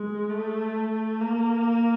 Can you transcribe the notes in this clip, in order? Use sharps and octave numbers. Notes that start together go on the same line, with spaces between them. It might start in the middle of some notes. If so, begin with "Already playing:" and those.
Already playing: G#3
A3
A#3